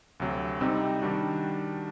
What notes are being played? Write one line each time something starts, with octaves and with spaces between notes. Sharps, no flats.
D2 C3 F#3
C3 G3 C4 D#4
D#3 G3 D4 F#4